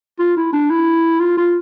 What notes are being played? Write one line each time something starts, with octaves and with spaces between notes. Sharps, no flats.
F4
E4
D4
E4
F4
F4